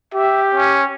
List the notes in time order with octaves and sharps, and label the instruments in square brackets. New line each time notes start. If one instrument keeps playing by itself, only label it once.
[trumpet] G4 [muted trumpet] E5
[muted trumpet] C#4